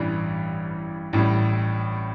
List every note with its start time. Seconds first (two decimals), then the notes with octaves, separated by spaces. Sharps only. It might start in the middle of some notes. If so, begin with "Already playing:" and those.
Already playing: A1 G2 E3 G3
1.13 A1 A2 G3